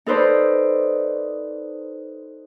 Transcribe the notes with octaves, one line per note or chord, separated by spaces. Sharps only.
D#4 A4 B4 C5 D5